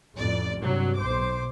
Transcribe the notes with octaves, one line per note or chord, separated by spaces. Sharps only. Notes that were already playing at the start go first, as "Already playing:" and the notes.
A1 F2 D5
G2 C3 F#3
B1 C5 D6